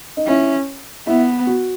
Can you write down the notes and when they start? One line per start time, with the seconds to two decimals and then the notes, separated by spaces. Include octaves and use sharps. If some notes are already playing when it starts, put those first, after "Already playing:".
0.17 D#4
0.27 C#4 E4
1.07 B3 E4
1.47 F#4